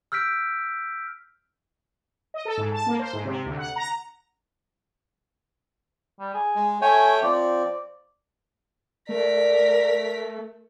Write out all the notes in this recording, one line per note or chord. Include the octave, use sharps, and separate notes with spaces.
E6 F6 G6 B6 D7
D#5
A4
G#2
A5
A#3
C5
G#2
C3
D2
F#5
A#5
G3
G#4
G#3
A3 C#5 G5 G#5
F3 C4 D5
A3 A#4 D5 B6